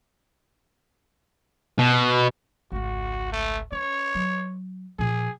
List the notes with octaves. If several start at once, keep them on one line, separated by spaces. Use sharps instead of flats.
B2
G#1 C#2 F#4
A3
C#4 C#5
F#3
A#2 F3 G#4